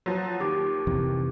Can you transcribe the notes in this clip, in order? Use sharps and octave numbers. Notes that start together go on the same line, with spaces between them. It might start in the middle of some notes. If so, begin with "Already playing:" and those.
F3 F#3
D#2 G4 D6
F2 C3 E3